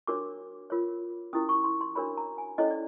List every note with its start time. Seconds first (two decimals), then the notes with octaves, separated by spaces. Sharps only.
0.07 D4 F#4 A#4 C#5 D6
0.70 F4 A#4 C#5
1.33 C#4 E4 G4 A#4 D#6
1.49 C#6
1.64 C6
1.81 C6
1.95 D4 F#4 A#4 C#5 B5
2.17 A#5
2.38 G#5
2.58 C#4 E4 A4 C#5 D#5
2.71 D5